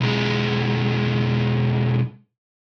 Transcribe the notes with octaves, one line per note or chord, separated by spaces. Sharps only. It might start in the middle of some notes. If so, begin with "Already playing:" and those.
B1 G#3